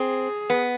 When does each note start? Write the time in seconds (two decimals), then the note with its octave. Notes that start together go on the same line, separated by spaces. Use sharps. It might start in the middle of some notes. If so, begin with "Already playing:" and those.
Already playing: C4 G#4
0.50 B3